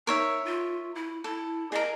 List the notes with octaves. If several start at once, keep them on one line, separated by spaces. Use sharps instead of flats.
D#4 A#4 C#5 E5
F4
E4
E4 A4
G#4 A#4 D#5